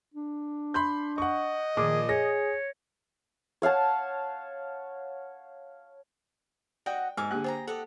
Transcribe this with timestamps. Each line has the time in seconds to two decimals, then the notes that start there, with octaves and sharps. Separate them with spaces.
0.14 D4
0.74 B5 C6 G6
1.18 D#5 F#5 C#6
1.77 A#2 D#3 F3 G#4 D6
2.09 G#4 C#5 A#6
3.62 C#5 F5 F#5 A5
6.86 F#4 D5 D#5 F#5 G5
7.17 G#2 G#5 D6 E6 F6
7.31 D3 A#3 G4 G#4 F#6
7.44 G#4 C5 G5 A#5
7.67 G4 A4 D#5 F#5